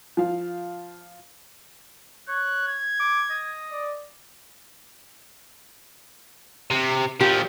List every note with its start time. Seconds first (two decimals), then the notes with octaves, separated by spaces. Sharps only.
0.17 F3 F5
2.28 C#5 F#6
2.68 G#6
3.00 D6
3.30 D#5
3.72 D5
6.71 C3
7.21 A#2 F3 G4